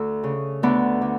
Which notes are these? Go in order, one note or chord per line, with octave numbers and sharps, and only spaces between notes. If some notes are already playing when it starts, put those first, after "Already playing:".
Already playing: D2 A4
C#3
D2 B3 D4
D3